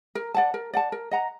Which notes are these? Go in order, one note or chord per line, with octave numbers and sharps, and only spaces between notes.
A#4
D5 F#5 A5
A#4
D5 F#5 A5
A#4
D#5 F#5 A#5